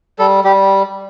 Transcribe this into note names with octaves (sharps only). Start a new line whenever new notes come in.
G3 A4
G3 G4